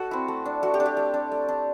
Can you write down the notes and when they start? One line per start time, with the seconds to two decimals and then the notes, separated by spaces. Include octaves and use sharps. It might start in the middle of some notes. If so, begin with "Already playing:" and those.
Already playing: F#4 A4
0.11 C4 E4
0.28 A3
0.45 D4
0.63 A3 F#4
0.74 G4
0.80 D4
0.86 G4
0.97 A3
1.14 D4
1.31 A3
1.48 D4